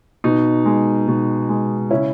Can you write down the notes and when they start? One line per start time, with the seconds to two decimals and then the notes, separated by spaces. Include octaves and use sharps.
0.24 B2 D#4
0.66 G#3
1.08 B2
1.49 G#3
1.91 C#3 C#4 E4